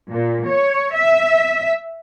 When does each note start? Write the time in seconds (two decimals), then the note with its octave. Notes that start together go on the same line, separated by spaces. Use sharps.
0.11 A#2
0.47 C#5
0.96 E5